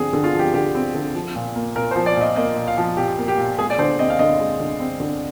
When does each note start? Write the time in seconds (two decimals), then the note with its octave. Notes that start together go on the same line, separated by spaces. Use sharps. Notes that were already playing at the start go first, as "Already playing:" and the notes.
Already playing: D3 F3 C4 G#4
0.13 D3
0.24 F4
0.33 F3
0.39 G4
0.54 D3 G4
0.75 C4
0.94 D3
1.15 F3
1.36 A#2
1.55 A#3
1.75 A#2 A#4
1.91 C5
1.96 F3
2.06 D5
2.16 A#2
2.21 D#5
2.36 A#3 D#5
2.56 A#2
2.68 F5
2.78 F3
2.97 A#2 G4
3.18 A#3
3.28 G4
3.38 A#2
3.58 G#3 G#4
3.70 D5
3.78 D3 C5
3.99 C4 D#5
4.10 F5
4.19 D3 D#5
4.39 G#3
4.60 D3
4.80 C4
5.00 D3